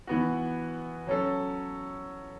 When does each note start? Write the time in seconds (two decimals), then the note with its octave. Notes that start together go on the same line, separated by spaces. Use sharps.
0.07 E3 B3 F#4
1.07 F#3 C#4 A4